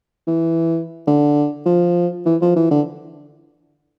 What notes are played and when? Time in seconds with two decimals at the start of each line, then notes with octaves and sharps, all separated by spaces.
0.27 E3
1.07 D3
1.66 F3
2.26 E3
2.41 F3
2.56 E3
2.71 D3